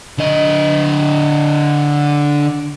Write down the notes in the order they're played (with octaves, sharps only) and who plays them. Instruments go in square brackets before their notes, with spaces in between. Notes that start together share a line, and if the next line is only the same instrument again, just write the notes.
[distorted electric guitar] D3 D#5